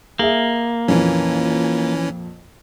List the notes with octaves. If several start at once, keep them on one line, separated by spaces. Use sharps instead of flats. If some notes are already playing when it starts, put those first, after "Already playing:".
A#3 G#4 E5
F2 A#2 E3 C#4